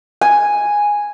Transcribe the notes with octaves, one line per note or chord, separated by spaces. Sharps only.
G#5